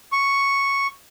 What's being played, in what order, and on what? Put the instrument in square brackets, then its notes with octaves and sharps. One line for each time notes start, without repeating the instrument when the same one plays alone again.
[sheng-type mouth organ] C#6